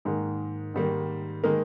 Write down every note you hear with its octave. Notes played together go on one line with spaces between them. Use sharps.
G#2 D#3 G#3 A#3 G#4
G#2 D#3 G3 A#3
D#3 G#3 A#3 A#4